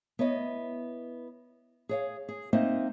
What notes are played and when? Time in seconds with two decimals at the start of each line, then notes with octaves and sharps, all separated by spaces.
0.19 B3 E4 C#5 D#5
1.89 G#4 C#5 F5
2.29 G#4
2.53 A#3 C4 D#4 C5 D#5 E5